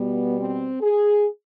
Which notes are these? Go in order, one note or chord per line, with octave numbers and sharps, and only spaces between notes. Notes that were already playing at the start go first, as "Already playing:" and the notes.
Already playing: B2 G3 B3
C4
G#4